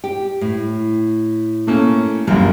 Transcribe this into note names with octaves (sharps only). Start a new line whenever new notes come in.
G4
A2
A3 A#3 C#4
G1 F#2 G3 A#3